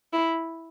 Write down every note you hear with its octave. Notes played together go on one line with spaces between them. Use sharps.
E4